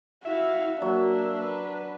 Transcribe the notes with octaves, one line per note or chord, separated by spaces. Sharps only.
E4 F#4 E5 F5
F#3 A#3 D4 A#5
B4